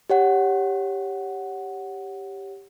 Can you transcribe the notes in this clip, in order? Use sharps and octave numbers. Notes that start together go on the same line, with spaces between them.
G4 C#5 F#5